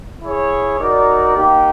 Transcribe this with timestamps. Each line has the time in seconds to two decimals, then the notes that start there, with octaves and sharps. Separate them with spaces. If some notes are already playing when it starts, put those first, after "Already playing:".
0.23 E4 G#4 C#5
0.80 D#4 F#4 A#4 D5
1.36 A#3 D#4 G4